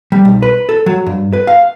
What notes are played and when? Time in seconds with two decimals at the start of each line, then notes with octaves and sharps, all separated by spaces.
0.12 G3
0.25 B1
0.42 B4
0.69 A4
0.86 F#3
1.07 G2
1.33 B4
1.47 F5